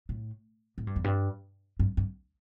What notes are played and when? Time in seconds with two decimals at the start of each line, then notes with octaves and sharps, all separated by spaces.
0.09 A2
0.78 A2
0.87 G2
0.96 E2
1.04 G2
1.79 G2
1.97 G2